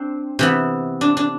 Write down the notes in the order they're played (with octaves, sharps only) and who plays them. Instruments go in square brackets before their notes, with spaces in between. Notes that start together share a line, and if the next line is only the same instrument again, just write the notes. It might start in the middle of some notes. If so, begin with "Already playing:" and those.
Already playing: [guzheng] C4 D4
C3 E3 B3
D4
D4